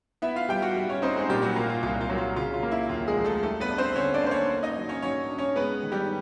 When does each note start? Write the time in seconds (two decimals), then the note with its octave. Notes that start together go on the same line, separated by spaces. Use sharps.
0.22 B3 E4 E5
0.36 F4 F5
0.49 G3 G4 G5
0.62 F#4 F#5
0.75 G3
0.89 C#4 C#5
1.02 C4 D#4 C5
1.16 G#3 G#4
1.29 A#2 G3 G4
1.42 F#3 F#4
1.56 A#3 F4
1.69 F4
1.83 C2 F4
2.01 F4
2.10 F#3
2.18 F4
2.36 C#3 F4
2.54 F4
2.63 A#3
2.71 E4
2.89 D#2 F4
3.08 G#3 G#4
3.17 F3
3.24 A3 A4
3.43 G3 A3 A4
3.60 B3 B4
3.70 D4
3.78 C4 C5
3.96 D3 C#4 C#5
4.14 D4 D5
4.23 A#3 C5
4.31 C#4 C#5
4.49 A#3
4.63 D#4 D#5
4.77 F#3
4.89 C#4 C#5
5.02 F#3 C#4 C#5
5.30 D4
5.38 C#4 C#5
5.56 G#3 B3 B4
5.83 D#3
5.92 G3 G4